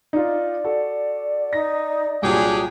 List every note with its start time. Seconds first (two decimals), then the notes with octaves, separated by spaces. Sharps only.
0.13 D#4 F4 D5
0.64 F#4 A4
1.53 D#4 A#6
2.22 C2 A#2 F#3 D4 G4 G#4